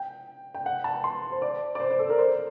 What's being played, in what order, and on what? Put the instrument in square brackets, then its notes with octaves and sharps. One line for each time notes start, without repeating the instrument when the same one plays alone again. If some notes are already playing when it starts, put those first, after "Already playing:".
Already playing: [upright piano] G5
G5
F#5
A5
C6
C5
D5
D5
C5
C5
A4
A#4
C5